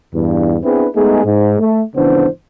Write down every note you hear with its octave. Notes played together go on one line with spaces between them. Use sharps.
E2 G2
B3 C4 D4 E4 G#4 B4
G#3 A3 B3 D#4 G#4
G#2
A3
G#1 C#3 E3 B3 D4 C5